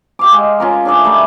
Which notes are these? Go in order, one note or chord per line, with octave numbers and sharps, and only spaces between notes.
G4 F5 D6
G#3
C#4 F4 A#4
D4 G#4 D5 E5
G3 A3